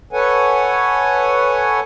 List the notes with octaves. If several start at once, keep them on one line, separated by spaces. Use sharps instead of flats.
A4 B4 C#5 F#5 G#5